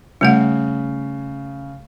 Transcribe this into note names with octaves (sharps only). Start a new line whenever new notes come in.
C#3 G3 A3 F#5